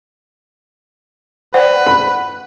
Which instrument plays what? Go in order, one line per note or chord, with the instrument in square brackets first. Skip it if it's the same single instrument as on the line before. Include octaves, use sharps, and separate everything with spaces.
[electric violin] B4 [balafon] C5 D5 G5 [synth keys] F#5
[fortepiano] B5